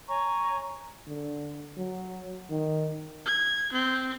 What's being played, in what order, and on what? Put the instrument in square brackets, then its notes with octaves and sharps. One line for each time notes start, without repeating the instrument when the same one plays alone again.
[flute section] C#5 G#5 A#5 C#6
[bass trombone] D3
F#3
D#3
[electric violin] G#6
C4